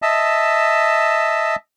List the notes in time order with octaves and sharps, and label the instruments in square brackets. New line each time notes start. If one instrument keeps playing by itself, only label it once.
[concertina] D#5 E5 A5